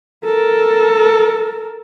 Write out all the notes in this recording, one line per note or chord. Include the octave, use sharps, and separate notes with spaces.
A4 A#4